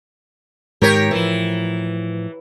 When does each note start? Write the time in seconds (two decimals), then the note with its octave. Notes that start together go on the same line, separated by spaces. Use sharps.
0.82 G#2 D#3 G4 A#4 C#5
1.11 A2 E3 F3